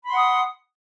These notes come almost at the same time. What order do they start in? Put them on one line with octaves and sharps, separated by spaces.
B5 C6 F#5 D#6